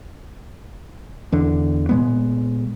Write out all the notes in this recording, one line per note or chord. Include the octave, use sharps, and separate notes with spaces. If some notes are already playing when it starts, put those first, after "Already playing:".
E2 D3
A#2 G#3 B3